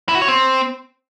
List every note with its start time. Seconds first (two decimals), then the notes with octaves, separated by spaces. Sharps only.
0.09 E4
0.15 F#4
0.22 C#5
0.28 C4